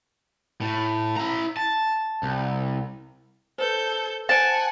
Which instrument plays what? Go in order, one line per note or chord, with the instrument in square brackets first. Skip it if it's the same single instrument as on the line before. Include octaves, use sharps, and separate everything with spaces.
[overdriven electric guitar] A2
E4 A#5
A5
C2
[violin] A4 G6 [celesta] B4 C5
[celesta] C5 D7 [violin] F#5 G#5 [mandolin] A5